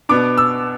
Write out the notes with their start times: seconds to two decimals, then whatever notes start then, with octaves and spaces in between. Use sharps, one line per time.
0.09 B2 B3 D4 D6
0.38 E6